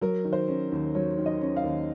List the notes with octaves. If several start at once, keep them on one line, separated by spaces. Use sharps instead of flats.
F#3 A#4
D#3
C5
C#4
D#2
F#3 C#5
D#3
D#5
C#4
F5
D#2